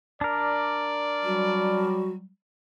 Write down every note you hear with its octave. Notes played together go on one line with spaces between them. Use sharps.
D4 A#4 D5
F#3 G3 F#4